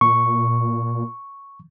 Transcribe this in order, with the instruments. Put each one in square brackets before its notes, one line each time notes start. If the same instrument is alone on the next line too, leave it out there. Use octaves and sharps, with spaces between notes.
[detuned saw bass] A#2 [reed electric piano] C#6